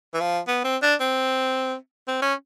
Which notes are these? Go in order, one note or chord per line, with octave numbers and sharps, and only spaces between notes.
E3
F3
B3
C4
D4
C4
C4
C#4